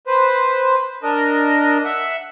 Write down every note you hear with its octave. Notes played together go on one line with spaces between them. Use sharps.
B4 C5
D4 A#4 D#5
E5 F#5